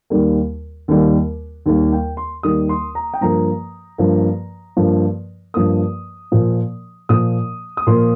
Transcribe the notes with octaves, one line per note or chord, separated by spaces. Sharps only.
D#2 D#3 G3 A#3
D#2 D#3 G3 A#3
D#2 D#3 G3 A#3
G5
C6
D#2 D#3 G3 A#3 D#6
C6
A#5
G5
G2 F3 A#3 A#5
G2 F3 A#3
G2 F3 A#3
G2 F3 A#3 D#6
A#2 F3 A#3
A#2 F3 A#3 D#6
D#6
A#2 F3 A#3 C6